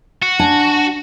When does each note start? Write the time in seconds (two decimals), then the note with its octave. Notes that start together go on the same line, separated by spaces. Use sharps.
0.22 F#4
0.39 D4 G#5 A5